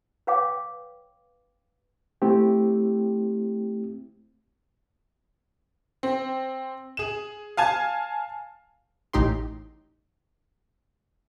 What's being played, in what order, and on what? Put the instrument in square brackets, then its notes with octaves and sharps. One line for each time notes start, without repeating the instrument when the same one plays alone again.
[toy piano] B4 C#5 F5 G5 D6
[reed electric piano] A3 C4 E4 G4
[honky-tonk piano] C4
G#4 E7
F5 G#5 A5 G#6
[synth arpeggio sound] A1 A2 D#4 G4 C6